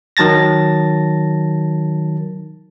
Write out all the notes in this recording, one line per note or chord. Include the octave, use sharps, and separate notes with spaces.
D#3 F#3 A5 A6 A#6